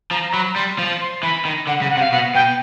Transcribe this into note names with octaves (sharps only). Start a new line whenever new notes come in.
F3 A#5
A#5
F#3 B5
G3 C6
F3
C6
E3 B5
D#3
D3 F#5
C#3
F#5
C3
F5
B2 F#5
B2 G5